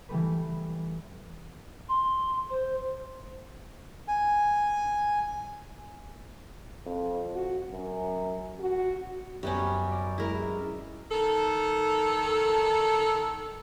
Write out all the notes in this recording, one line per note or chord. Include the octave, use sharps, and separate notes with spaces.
E3 G3 A3 B4
C6
C5
G#5
F2
F#4
F#2
F#4
F#2 G3 B3 C#4
D5
G#3 E4 A#4
D#3 A4